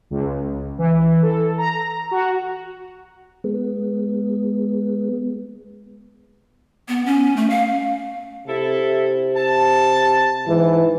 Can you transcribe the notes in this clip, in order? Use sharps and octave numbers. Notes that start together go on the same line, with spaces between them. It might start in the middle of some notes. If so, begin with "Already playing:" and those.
C#2
E3
A4
A#5
F#4
G#3 B3
B3
C#4
A3
F5
C3 E4 A4
A5
G#2 E3